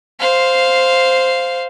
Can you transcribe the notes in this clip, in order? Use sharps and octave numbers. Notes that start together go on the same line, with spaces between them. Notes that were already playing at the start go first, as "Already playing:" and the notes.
C5 F5